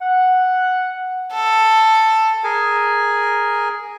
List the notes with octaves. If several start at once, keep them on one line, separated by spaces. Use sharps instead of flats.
F#5
A4
G#4 A#4 G#5